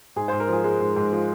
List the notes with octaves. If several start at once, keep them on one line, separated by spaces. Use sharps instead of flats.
G#2 G#4
G#2 C5
A#4
F3 G#4
G#3
G#2
G#2
F3